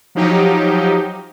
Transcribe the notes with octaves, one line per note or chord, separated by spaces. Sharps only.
F3 F#3 D#4 G4